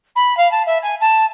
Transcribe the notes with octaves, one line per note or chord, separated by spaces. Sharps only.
B5
F5
A5
E5
G#5
A5